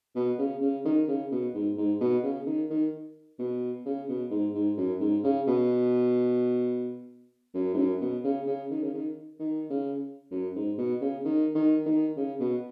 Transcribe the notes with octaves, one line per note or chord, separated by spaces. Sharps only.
B2
C#3
C#3
D#3
C#3
B2
G#2
G#2
B2
C#3
D#3
D#3
B2
C#3
B2
G#2
G#2
F#2
G#2
C#3
B2
F#2
G#2
F#2
B2
C#3
C#3
D#3
C#3
D#3
D#3
C#3
F#2
G#2
B2
C#3
D#3
D#3
D#3
C#3
B2